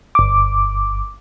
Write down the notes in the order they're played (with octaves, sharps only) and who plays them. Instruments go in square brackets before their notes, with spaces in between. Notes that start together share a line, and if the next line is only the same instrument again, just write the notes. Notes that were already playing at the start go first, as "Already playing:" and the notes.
[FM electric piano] G1 D6